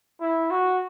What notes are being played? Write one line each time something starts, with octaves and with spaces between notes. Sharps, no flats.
E4
F#4